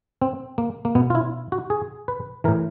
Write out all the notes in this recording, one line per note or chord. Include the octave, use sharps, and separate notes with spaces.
C4
A#3
A#3
B2 B3
F4
E4
F#4
G#4
B4
A2 E3 A#4